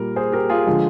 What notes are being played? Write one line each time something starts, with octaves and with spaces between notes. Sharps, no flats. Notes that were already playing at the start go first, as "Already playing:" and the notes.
Already playing: A#2 G3 A#4
G#4 C5
G4 A#4
F4 G#4
D3 F3 G#3